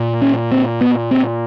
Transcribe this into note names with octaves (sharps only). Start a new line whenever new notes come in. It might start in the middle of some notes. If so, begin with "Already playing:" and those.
Already playing: A#2
C#4
C4
B3
C4